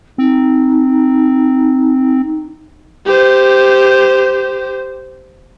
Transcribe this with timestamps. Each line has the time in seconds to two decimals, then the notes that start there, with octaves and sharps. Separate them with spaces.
0.18 C4 D#4
3.06 G4 C5